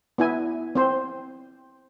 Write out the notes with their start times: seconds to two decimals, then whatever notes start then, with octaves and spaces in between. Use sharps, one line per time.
0.18 B3 E4 G#5
0.75 C4 C5